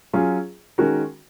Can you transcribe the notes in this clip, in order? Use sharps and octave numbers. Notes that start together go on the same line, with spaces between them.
F#3 C#4 F4 G#4
D#3 G#3 C#4 F#4 A#4